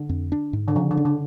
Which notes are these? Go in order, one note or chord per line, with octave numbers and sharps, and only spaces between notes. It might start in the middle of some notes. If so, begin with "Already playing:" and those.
Already playing: D3
F2
D4
G#2
D3
C#3 F3
D3
D4
D3